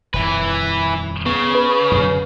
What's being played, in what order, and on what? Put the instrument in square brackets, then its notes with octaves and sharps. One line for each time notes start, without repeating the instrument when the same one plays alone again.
[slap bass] D#1 F2 [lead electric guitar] E3 B4
[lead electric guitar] C#3 [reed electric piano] B3
[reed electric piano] B4
[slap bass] F#2 B2 D3